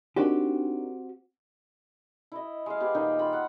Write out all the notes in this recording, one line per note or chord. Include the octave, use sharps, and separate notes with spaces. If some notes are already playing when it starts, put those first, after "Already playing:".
C4 D4 D#4 F#4 G4 A#4
E4 D#5
G#3 F5
B3 G4 G#4
A#2 D#3 D#4 G5
F4 B5
F#5